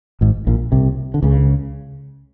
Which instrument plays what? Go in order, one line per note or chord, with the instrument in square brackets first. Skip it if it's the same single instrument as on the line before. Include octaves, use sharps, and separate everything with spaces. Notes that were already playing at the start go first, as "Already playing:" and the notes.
[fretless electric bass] G#1 G#2
A#1 A#2
C2 C3
D3
C#2 C#3